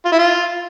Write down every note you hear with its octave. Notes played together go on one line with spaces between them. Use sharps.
F4
E4
F4